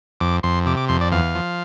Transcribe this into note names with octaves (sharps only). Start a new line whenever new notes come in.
F2 D6
F2 C6
C3 D6
D6
F2 C6
D5
E2 F5
F3